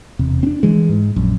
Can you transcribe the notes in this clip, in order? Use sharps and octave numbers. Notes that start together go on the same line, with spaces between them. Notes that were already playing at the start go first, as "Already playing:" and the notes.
E1 C3
C4 D4
E3 G#3
G#2
A#1 F#2